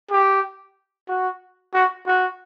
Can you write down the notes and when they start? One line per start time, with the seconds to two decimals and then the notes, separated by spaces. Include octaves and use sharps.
0.11 G4
1.09 F#4
1.74 F#4
2.07 F#4